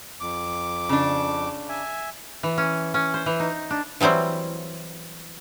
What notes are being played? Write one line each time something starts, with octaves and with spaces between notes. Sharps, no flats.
F2 D6
C#3 D4
E5 G#5
E3
C#4
C#4
C5
E3
D#4
D4
E3 F#3 G3 C4 E4